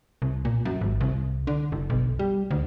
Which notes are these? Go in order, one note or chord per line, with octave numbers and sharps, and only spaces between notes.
C2
A#2
F#2
G#1
C2
D3
F#1
B1
G3
D2